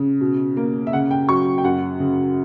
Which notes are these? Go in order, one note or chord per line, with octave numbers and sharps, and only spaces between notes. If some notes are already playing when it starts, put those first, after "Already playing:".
Already playing: C#3
B2
A#3
E5
C#3 F#5
G5
F#3 C#6
G5
F#2 F#5
C#3